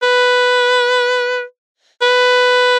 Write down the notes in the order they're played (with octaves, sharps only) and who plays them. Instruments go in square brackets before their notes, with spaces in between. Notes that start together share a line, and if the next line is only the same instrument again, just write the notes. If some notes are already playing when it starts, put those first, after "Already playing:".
[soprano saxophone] B4
B4